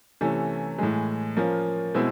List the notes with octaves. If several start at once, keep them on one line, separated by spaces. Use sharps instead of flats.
C3 E3 A3 C#4
A2 E3 G#3
F3 A#3 C#4 F4
B2 G#3 C4 E4